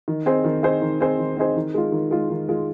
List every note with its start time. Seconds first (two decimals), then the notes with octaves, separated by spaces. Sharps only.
0.08 D#3
0.26 C4 D#4 G#4 C5
0.44 D#3
0.63 C4 D#4 G#4 C5
0.82 D#3
1.01 C4 D#4 G#4 C5
1.19 D#3
1.37 C4 D#4 G#4 C5
1.56 D#3
1.74 G#3 F4
1.92 D#3
2.11 G#3 F4
2.30 D#3
2.49 G#3 F4